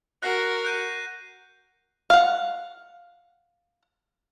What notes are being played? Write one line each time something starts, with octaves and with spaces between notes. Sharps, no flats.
F#4 A#4 F#6 A#6 C7
F#6 G6 D#7
F5 F#5